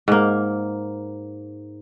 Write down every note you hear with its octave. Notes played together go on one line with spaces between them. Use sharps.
G#2 A#3